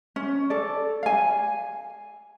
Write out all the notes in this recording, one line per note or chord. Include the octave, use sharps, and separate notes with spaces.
C#4
A4 D5
F5 G#5